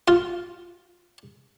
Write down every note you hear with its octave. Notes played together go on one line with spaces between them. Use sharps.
F4